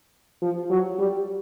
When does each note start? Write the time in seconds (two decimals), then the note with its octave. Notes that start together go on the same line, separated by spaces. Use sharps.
0.42 F3
0.70 F#3
0.98 G3